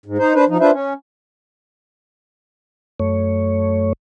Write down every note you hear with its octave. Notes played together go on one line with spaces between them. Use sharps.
G#2
D#4 C5
D4 B4 C5
F3 D#4
D4 F4 B4 C5 E5
C#4
F#2 A3 C#5